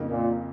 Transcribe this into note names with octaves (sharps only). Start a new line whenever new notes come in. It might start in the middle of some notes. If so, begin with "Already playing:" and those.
Already playing: F2 C#3 A#3 D#4
A#2